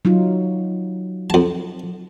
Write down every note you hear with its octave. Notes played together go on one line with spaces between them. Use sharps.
F#3 D#4 F4
F2 A5